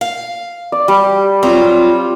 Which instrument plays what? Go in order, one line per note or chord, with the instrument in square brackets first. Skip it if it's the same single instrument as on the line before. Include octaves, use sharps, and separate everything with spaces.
[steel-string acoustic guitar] F5
[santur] D5
[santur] G3 [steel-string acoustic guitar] G4
[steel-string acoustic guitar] F#3 G3 F4 [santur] C4